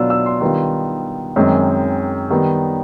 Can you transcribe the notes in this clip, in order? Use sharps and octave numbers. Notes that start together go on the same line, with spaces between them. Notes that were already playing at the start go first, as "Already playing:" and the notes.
Already playing: B2 F#3 B3 D4 F4 E6
E6
C6
D#3 G3 B3 D4 F4
F#2 D#3 G#3 C4
D#3 G3 B3